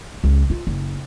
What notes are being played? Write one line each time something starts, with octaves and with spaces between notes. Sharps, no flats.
C#2
F4
F#1